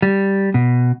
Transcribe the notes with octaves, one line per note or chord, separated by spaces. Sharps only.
G3
B2